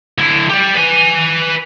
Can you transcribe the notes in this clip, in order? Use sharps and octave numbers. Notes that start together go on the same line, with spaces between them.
D3 E4
G4 D5
B4 G#5